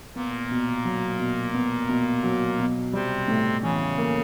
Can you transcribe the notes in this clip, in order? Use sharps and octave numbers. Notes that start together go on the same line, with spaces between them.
A#2 A#3 B3
B2
F#3
B2
B3
B2
F#3
B2
C3 G3 C4
A2
C#3 E3 C#4
A#3